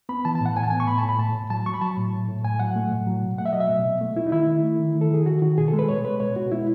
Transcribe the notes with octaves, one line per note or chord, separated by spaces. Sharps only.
B3 B5
E3 A5
A5
A2
F#5
A2 G#5
A5
B3 G#5
C#6
A2 B5
A5
A2
B5
A2 A5
A2
F#3 A5
F#3 C#6
B5
F#3 A5
A2
A2
A2
A2 G#5
F#3 F#5
A3
A2
F#3
B2
A3 F#5
E5
F#3 D#5
E5
B2
B2
A3
A3 E4
D#4
D#3 E4
A3
A3
D#3
D#3
A4
D#3 G#4
D#3 F#4
D#3 F#4
B2 G#4
A4
G#3
B4
B2 C#5
G#3 B4
B2 C#5
B2 F#4
G#3 E4